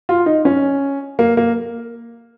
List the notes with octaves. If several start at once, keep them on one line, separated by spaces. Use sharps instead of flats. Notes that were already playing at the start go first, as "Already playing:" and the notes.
F4
D#4
C#4
A#3
A#3